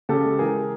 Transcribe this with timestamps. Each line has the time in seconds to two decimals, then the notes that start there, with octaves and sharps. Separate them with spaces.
0.09 C#3 G4 A4
0.24 G#3
0.39 E3 G#4 A#4